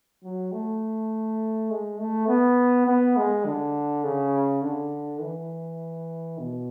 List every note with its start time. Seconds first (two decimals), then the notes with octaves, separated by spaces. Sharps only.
0.24 F#3
0.52 A3
1.70 G#3
2.00 A3
2.28 B3
2.87 B3
3.17 G#3
3.45 D3
4.04 C#3
4.62 D3
5.21 E3
6.38 B2